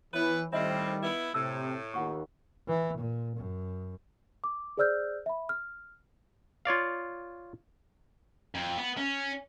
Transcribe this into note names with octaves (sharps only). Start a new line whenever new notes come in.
E3 B3 E4 B4 C#5 B5
A2 D#3 F3 G3 C4 D#5 E5 B5
B3 E4
A2 C3 E6
D#2 F4 F#5 C#6
E3
A#2
F#2
D6
G#4 C5 D5 E6 F6 G6
E5 B5
F6
F4 C#5 D5 F5
F2
B3
C#4